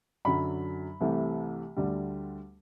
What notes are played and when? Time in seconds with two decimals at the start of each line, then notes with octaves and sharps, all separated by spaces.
0.25 F#2 D3 F#3 B5
1.00 C2 C3 E3 A3
1.76 D2 D3 G3